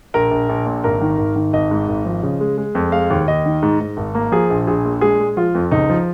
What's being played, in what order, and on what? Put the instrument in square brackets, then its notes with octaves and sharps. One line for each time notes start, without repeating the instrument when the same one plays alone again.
[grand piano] A#1 A#4
A#1
A#1
A#2
G#1 A#4
D#3
G#1
D#3
G#1 D#5
G#2
G#1
F3
C#3
G#3
G#3
F2
G#3 F5
D#2
D#2 D#5
D#3
G#2
G#2
G#1
A#3
F3 G#4
A#1
A#1 G#4
A#2
G#3 G#4
G#3
F3 F4
F2
C#2 D#4
F3